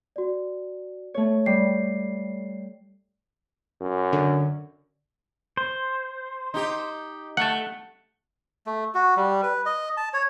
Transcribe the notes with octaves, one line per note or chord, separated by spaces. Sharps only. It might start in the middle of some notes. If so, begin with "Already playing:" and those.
F#4 D5
A3 C#5
G3 C7
F#2
D3
C5
D#4 G4
A3 F#5 A5
A3
F#4
G3
B4
D#5
A5
C#5